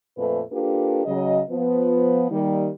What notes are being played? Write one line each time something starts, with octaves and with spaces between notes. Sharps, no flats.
F2 A#2 A3 B4
A#3 D4 F4 G4 A4 B4
C#3 F#3 D#5
F3 B3
D#3 G3 A#3